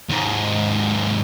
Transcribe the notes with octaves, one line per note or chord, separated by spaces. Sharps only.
D#2 G#2